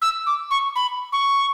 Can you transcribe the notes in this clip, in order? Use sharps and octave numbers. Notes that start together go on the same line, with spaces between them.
E6
D6
C#6
B5
C#6